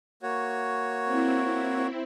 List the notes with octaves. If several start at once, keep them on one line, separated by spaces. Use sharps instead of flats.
A#3 F#4 C#5
C4 E4